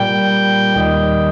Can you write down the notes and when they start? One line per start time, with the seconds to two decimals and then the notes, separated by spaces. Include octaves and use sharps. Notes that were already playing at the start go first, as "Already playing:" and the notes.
Already playing: A#2 G3 G5
0.76 D#2 D#3 G3